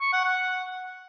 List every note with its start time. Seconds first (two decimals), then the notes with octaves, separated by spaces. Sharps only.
0.01 C#6
0.13 F#5
0.25 F#5